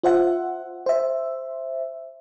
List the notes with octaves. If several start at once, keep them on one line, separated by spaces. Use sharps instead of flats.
F4 C5 E5 F#5
C5 E5